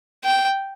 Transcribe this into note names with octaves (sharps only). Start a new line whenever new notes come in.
G5